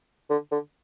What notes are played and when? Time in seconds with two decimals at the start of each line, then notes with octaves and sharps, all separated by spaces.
0.30 D3
0.52 D3